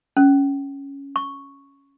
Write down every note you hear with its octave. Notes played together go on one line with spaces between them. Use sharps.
C#4
C#6